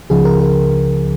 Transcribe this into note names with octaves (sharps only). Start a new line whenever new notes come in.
C#2 C#3 F3 G#4
A#4
A#4